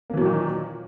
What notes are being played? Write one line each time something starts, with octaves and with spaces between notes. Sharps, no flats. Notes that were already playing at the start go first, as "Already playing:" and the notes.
A#2 D#3 E3 F#3 A#3